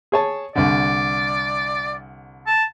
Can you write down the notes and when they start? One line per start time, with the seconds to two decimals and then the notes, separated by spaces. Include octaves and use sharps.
0.12 G#4 C#5 A5
0.55 C2 D3 D5
2.47 A5